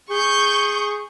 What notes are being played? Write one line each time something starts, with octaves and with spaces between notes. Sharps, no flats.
G#4 C#6 G6